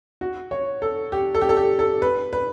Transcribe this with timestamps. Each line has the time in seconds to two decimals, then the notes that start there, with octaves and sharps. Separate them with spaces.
0.21 F#4
0.51 C#5
0.82 A4
1.12 G4
1.35 A4
1.42 G4
1.49 A4
1.57 G4
1.79 A4
2.02 B4
2.33 B4